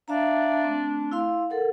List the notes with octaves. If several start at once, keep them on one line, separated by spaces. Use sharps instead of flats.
D4 E5 F5 A#5
A3 C4
E4 F5 C6
A4 A#4 F#5